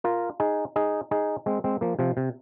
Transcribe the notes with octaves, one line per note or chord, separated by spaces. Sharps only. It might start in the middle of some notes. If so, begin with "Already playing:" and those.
F4 A#4
D#4 G#4
D#4 G#4
D#4 G#4
G#3 C4
G#3 C4
F3 A#3
C3 F3
C3